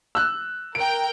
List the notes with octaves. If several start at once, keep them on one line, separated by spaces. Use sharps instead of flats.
E6 F#6
A#4 G5 D7